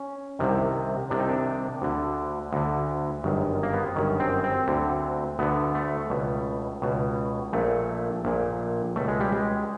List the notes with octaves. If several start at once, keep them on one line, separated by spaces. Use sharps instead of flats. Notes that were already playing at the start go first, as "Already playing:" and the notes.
Already playing: C#4
C2 C3 D#3
C2 C3 D#3 D4
D#4
D4
D2 D3
D2 D3
G1 F#2 D#3
A#3
B3
C4
G1 F#2 D#3 C#4
C4
C4
D2 D3
D2 D3 B3
A3
C#2 B2 A3
C#2 B2
A#1 A#2 A3
A#1 A#2
C#2 B2 A3
G#3
G3
G#3